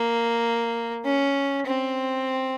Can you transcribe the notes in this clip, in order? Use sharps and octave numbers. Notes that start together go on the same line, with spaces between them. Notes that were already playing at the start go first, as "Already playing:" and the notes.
Already playing: A#3
C#4
C4